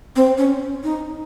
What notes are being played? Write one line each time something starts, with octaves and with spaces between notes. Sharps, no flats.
C4
C#4
D#4